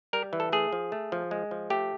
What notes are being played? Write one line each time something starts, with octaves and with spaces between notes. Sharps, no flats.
G3 A#4
E3
A4
A3 G#4
F3
A3
F3
G#3
F3
A3 G4